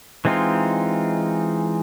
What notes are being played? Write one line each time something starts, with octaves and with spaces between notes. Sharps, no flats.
E3 G#3 C4 D#4 F4